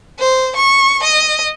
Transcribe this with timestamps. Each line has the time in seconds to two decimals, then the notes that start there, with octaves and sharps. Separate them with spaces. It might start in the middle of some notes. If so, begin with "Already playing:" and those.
0.21 C5
0.57 C#6
1.04 D#5